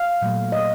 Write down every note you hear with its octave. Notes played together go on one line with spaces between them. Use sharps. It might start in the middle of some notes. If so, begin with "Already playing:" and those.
Already playing: F5
A#2 F#3 A3
D#5